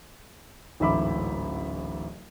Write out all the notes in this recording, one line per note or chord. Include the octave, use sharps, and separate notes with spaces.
D1 A1 G#2 E5 B5 D6